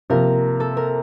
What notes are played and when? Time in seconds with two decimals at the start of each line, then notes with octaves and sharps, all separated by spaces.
0.10 C3 F3 A#3 A#4
0.60 A4
0.77 A#4